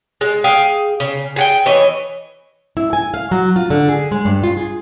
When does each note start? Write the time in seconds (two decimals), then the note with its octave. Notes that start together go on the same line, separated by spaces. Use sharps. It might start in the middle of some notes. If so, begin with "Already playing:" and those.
0.21 G#3
0.44 G#4 F5 G5
1.00 C#3
1.36 G#4 F#5 G5
1.66 E3 C#5 D#5
2.77 E4
2.93 G#5
3.14 F5
3.31 F#3
3.56 F4
3.70 D3
3.89 G#4
4.11 G#3
4.25 G2
4.43 F4
4.57 G#4